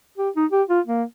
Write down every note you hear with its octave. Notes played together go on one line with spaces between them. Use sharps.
G4
D#4
G4
F4
A#3